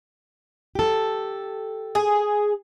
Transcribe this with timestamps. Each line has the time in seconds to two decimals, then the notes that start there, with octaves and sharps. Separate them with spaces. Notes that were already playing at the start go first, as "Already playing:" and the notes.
0.75 G4 A4
1.95 G#4